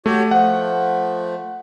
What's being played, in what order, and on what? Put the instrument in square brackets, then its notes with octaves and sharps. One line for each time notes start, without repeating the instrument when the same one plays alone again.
[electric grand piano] A3 [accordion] F#4 G4 C#5
[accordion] F3 A3 [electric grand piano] F#5